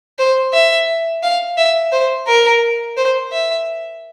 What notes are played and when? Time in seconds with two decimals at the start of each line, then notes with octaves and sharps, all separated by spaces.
0.19 C5
0.54 E5
1.23 F5
1.57 E5
1.92 C5
2.27 A#4
2.97 C5
3.32 E5